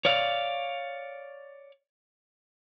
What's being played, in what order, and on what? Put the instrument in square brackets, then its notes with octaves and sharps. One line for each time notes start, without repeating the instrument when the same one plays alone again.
[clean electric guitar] C#5 D5 F5